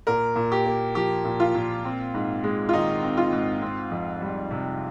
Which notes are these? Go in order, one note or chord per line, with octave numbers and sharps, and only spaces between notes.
A#2 A#4
A#2
G4
A#3
F3 G4
A#2
F4
A#2
C4
G#2
G#3
F4
D#3 D#4
C4
F4
G#2
C4
F2
G3
C3